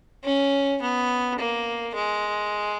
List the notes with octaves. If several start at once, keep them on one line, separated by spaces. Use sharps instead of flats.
C#4
B3
A#3
G#3